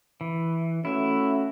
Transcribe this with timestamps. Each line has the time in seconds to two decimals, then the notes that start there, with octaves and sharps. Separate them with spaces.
0.21 E3
0.85 A3 C#4 E4 F#4 E5